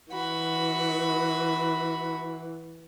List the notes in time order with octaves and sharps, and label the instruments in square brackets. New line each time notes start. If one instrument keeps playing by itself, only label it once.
[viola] E3 [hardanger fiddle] F#4 B5